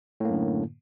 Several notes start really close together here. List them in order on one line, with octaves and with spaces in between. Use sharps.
A2 A#3 F#2 D3